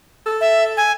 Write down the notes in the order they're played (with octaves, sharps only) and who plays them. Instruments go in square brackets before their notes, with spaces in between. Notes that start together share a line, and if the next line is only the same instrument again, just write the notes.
[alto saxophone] A4
[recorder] E5
G#5